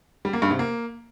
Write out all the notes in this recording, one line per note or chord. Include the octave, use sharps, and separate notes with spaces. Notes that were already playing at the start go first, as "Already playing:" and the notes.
G3
A#3
G2
C3
A#3